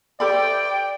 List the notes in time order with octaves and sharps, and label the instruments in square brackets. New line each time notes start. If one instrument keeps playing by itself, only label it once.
[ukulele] G4 A4 B5 [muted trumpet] D5 [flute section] G5